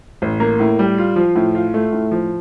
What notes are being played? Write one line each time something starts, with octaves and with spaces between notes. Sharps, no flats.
A1
A#3
A2
G3
F4
F3
A2
F4
A3
A2
F3